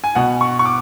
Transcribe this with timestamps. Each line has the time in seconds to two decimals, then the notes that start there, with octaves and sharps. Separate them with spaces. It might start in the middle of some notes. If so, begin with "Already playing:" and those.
0.04 G#5
0.15 B2 F#5
0.41 C#6
0.59 C#6
0.65 D6